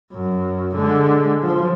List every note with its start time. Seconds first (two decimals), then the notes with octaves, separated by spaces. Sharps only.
0.13 F#2
0.75 D3 G#3
1.43 F3